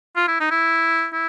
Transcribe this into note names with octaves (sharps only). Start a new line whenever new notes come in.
F4
E4
D#4
E4
E4